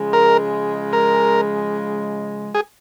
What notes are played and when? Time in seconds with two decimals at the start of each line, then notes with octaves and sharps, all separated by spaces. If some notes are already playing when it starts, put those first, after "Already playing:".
Already playing: C#3 F3 G#3
0.13 A#4
0.93 A#4
2.55 G#4